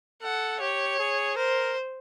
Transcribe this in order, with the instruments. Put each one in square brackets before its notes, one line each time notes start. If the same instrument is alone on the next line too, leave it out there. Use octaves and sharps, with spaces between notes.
[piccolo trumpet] A4 [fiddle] F#5
[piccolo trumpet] G4 [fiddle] C#5
[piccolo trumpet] G#4
[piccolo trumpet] A#4 [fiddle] C5